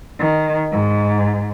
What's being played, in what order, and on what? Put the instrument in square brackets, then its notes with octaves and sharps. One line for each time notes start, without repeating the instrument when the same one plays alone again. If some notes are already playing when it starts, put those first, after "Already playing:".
[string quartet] D#3
G#2